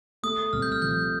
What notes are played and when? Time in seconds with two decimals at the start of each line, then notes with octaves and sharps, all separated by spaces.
0.23 A3 D#6
0.53 C2 F6
0.62 G6
0.72 F6
0.82 F3 G6